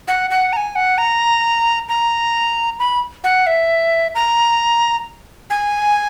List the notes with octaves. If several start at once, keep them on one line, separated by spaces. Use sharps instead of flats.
F#5
F#5
A#5
G#5
F#5
A#5
A#5
B5
F#5
E5
A#5
G#5